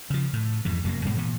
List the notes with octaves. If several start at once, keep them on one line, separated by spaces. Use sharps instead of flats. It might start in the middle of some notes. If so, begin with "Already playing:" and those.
C#3 F3
A2
F2 G#2 E3
F1 F#2 F#3 A#3
G#2 B2 G3 G#3
A#2 E3